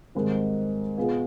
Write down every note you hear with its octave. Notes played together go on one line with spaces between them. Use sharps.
G#2 D#3 G3 C4
B2 B3 F4 G#4